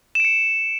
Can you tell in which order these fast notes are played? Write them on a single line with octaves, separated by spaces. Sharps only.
E7 D7 C#7